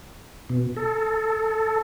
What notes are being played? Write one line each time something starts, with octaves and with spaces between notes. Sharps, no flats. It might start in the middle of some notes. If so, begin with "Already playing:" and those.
B2
A4